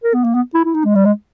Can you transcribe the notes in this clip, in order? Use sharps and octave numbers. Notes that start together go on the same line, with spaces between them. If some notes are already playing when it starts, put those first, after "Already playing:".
A#4
B3
A#3
B3
E4
E4
D#4
G#3
G3
G#3